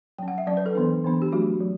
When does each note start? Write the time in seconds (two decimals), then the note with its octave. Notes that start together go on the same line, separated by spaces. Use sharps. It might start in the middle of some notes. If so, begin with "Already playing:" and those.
0.18 F#3 C#4 G5
0.28 F#5
0.38 E5
0.47 F#3 C#4 D5
0.57 B4
0.66 A4
0.75 E3 B3 D4
1.04 E3 B3 D4
1.22 G4
1.32 F#3 A3 D4 F#4
1.60 F#3